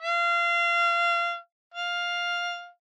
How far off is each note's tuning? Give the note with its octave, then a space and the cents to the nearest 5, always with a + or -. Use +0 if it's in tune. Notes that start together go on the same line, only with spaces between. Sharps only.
F5 -25
F5 +5